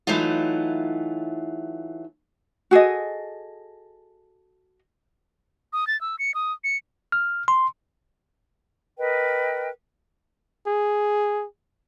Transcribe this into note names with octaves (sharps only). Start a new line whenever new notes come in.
E3 F#3 A3 D#4 F4
F#4 G#4 A4 D#5
D#6
A6
E6
C#7
D#6
C#7
F6
C6
A#4 B4 D#5 G5
G#4